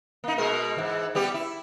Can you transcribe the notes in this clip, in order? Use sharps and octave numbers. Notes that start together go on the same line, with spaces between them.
A#3 D#4
B2 G#3 A#4
G#2 E3
G3 B3 G4
E4